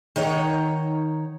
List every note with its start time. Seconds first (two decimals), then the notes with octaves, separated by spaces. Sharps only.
0.16 D#3 D#4 C#5 F#5